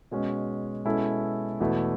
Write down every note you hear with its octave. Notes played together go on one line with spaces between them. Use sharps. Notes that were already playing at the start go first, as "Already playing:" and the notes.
B2 G#3 C#4
B2 G#3 C#4 E4 A4
E2 B2 A3 E4